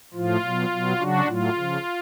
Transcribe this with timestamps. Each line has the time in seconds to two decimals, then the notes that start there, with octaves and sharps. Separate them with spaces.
0.14 A2 F3 F4
0.42 B2 F#3
0.71 B2 F#3
0.98 C#3 F#3 D4 F#4
1.27 A2 F#3 F4
1.55 C#3 F3